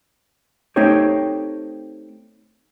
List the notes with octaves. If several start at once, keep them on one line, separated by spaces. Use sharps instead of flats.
A3 C4 D#4 G4 C5 C#5